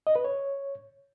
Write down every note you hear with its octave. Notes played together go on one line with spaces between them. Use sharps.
D#5
B4
C#5